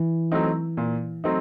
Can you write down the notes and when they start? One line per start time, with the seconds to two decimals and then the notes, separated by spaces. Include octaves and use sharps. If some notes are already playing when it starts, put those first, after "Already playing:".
Already playing: E3
0.32 F#3 A3 C4 D#4
0.77 A#2
1.24 F#3 A3 C4 D#4